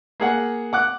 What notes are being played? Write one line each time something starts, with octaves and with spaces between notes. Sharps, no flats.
A#3 G#4 F#5
F#5 D6 F#6